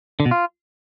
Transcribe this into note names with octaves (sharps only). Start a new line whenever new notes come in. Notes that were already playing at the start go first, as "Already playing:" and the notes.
D3
B2
F4